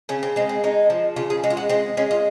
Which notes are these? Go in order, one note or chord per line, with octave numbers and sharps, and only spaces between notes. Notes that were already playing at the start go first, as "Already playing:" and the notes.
C#3 C#4
C4
G#3 C4
C4
G#3 D#4
F3
C#3 F4
G#4
G#3 F#4
F4
F#4
G#3 C4
G#3 C#4
F4